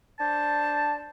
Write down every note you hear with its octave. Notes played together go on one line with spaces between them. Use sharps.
D4 C5 A5